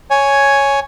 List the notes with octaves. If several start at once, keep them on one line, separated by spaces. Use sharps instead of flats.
C#5 G#5